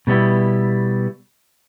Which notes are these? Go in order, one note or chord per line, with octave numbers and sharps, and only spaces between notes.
B2 G3 B3 E4